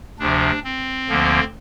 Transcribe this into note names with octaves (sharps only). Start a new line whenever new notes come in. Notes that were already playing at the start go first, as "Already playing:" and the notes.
D2 C3 F3 D4
C4
D2 D3 F3 A#3